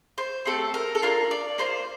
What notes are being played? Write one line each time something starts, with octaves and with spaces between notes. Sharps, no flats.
C5
A3 C4 G4 A4
A#4
A4
A#3 D4 F4 A#4
D5
A#3 D4 F4 C5